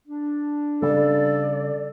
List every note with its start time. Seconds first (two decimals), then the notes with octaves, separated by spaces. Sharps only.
0.08 D4
0.82 C#3 G3 A4 D5